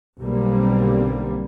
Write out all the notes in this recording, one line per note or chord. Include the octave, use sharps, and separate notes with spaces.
B1 D3 G3 A#3 C4